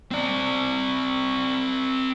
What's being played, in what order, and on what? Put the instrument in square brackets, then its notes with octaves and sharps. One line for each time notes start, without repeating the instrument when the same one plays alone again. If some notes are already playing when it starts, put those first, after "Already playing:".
[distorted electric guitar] C4 D5